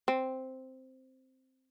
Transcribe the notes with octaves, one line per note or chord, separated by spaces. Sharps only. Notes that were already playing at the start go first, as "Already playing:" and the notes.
C4